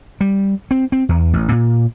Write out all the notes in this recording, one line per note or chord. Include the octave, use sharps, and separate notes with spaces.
G3
C4
C4
E2
A1
A#2